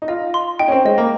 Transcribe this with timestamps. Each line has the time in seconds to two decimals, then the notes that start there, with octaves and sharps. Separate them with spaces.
0.02 D#4
0.08 F4 D#5
0.34 C6
0.59 D#4 G5
0.68 C#4
0.72 C4
0.85 G#3 D#5
0.98 A#3